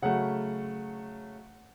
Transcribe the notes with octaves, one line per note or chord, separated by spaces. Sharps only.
C#3 F#3 A3 F#5